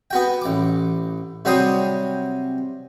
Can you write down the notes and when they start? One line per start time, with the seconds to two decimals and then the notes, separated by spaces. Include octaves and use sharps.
0.11 B3 F#4 G5
0.41 A1 D6
1.45 C3 F#3 G3 C5 G5 D#6